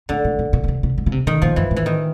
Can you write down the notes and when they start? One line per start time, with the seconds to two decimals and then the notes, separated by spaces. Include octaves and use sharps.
0.09 A2 D3
0.25 A2
0.39 A#2
0.53 A#2
0.64 C#3
0.68 C3
0.83 C3
0.98 G#2
1.06 C#3
1.12 C3
1.27 B2 D#3
1.42 A#2 F3
1.56 F#2 E3
1.71 A2
1.76 E3
1.86 D#3